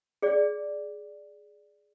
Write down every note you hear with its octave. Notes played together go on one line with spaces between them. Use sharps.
G#4 D5